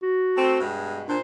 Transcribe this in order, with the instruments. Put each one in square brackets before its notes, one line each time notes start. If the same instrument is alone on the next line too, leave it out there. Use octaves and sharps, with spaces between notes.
[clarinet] F#4
[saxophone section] A3 C4
G2 B2 G#3
[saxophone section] A#2 C5 [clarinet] D4